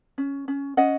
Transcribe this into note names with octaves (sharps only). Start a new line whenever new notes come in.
C#4
C#4
C#4 D#5 F#5